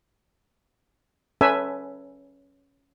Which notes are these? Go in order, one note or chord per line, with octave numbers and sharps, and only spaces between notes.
C#4 A4 B4 E5 G#5